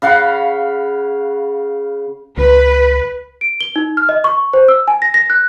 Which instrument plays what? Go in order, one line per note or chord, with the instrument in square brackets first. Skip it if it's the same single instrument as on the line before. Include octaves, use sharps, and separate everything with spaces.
[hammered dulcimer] C#3 F5 F#5 B5
[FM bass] C#2 [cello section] B4
[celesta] D7
G7
D#4
F6
D#5
C#6
C5
E6
G#5
A#6
A#6
F#6